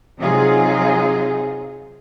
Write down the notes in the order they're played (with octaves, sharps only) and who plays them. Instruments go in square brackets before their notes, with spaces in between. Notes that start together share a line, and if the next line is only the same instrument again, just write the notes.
[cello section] C3 F#3 D#4 F4 G#4